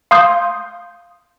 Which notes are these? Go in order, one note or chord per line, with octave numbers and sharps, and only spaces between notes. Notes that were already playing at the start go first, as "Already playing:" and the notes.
F5 C6 D#6 G6